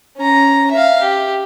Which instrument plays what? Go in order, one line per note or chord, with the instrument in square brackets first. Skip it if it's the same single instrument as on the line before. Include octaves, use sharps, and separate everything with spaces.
[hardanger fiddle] C#4 A#5
E5 F5
G4